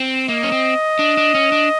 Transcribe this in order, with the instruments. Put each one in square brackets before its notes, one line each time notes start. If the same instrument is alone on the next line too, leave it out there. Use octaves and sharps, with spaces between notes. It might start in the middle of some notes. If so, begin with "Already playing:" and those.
Already playing: [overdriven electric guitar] C4
[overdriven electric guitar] A#3 [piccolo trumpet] D#5
[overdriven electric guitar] C#4
C4
D4
D4
C#4
D4